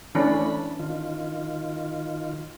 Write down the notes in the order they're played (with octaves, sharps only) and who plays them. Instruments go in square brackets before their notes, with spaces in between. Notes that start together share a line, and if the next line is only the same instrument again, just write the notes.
[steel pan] E3 C#4 D4 [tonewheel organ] A3 B5
[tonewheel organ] D#3 F4